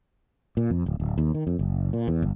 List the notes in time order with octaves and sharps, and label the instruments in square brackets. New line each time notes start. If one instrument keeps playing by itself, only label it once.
[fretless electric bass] A#2
F2
D1
D1
D#2
D#3
F2
F#1
A#2
E2
G1